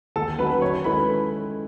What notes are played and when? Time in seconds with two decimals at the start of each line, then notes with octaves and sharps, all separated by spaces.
0.16 D#2 A4 A5
0.38 D#3 F#3 C#4 F#4 B4 B5
0.61 D#3 C#5 C#6
0.84 G#3 C#4 E4 A4 B4 B5